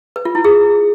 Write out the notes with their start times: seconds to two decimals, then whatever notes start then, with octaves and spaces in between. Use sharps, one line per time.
0.16 B4
0.25 F4
0.35 E4
0.44 G#4